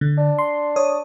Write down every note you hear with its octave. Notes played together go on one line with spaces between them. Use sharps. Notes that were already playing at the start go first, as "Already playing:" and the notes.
D3
D4
C6
C#5 D#6